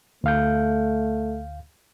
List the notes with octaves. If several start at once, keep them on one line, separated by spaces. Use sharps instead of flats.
D2 A3 F5 G6